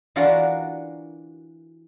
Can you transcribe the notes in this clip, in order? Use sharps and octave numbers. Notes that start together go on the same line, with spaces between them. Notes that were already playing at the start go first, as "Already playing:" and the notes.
E3 D4 F4 F#4 A#4